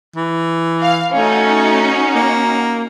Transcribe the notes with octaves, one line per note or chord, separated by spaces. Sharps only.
E3
F5
A3 C#4 D#4 F#4
A#3